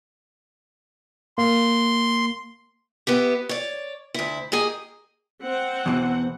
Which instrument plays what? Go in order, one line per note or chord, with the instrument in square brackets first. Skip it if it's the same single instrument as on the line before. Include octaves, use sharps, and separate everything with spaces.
[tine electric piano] A#3 [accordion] C6
[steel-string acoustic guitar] B3 E4 G4
C#5 D5
D2 E4
A#3 G4 G#4 D#5
[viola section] C4 F#5
[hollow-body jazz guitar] E2 B2 E3